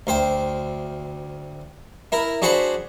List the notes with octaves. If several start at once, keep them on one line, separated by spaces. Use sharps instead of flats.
D2 C5 G5
E4 A#4
D4 F#4 G#4 C5 F#5 B5